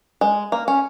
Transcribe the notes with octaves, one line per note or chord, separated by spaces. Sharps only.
G#3
A#3
C#4